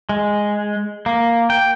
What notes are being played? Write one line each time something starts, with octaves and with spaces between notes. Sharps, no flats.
G#3
A#3
G5